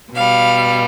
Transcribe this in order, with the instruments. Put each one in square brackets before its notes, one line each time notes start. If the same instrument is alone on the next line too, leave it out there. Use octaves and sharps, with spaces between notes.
[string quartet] B2 G3 F5